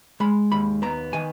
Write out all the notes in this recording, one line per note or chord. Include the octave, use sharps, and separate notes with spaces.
G#3 B5
D#2 B5
B3 A#5
D#3 G#5